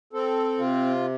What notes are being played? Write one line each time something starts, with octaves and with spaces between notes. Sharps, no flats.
C4 A4
C3 F4